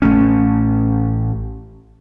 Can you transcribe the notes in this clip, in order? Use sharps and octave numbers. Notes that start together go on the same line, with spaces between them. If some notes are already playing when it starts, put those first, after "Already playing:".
A1 F#3 A3 C#4